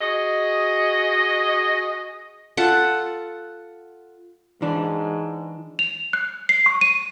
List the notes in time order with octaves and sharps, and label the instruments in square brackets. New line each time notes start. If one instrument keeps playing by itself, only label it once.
[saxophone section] F#4 G#4 D#5
[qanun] F4 A4 F#5
[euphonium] G#2 [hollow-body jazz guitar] E3 D4
[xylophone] F7
F#6
C7
C#6
D#7